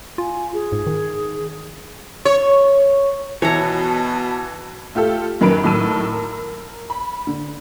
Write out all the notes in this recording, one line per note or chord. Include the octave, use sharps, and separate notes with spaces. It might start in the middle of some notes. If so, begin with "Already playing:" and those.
F4 G#5
G#4
G#2
D#3
C#5
B2 E3 C#5 A5 A#5
A3 F4 G4 A4
F#2 D#3 F#3 B4 D7
A2 D#3 F#3 A5 E6 D#7
A#4
B5
D3